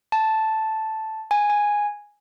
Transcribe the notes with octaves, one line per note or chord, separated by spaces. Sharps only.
A5
G#5
G#5